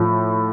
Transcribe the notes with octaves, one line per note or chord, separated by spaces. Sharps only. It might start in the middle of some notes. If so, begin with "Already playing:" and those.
Already playing: A2 F3